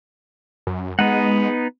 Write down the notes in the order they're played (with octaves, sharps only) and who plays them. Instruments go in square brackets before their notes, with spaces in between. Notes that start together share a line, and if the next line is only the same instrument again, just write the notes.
[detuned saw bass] F#2
[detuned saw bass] G#3 [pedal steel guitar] B3 D#4 F#5